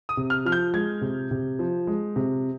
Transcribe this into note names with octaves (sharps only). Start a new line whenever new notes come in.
D#6
C3
F6
F3 F6
G6
G#3 G#6
C3
C3
F3
G#3
C3